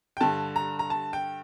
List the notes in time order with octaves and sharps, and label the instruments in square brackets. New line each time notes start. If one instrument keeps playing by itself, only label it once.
[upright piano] G5
G2 D3 A5
A#5
A#5
A5
G5